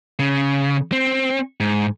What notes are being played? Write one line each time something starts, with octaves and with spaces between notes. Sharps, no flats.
C#3
C4
G#2